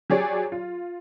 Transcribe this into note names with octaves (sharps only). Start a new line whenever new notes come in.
F#3 G4 G#4 C#5 D5
F4